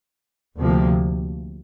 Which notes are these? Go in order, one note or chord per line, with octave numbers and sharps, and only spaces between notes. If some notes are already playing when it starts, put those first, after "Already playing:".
D2 C3 F3 A#3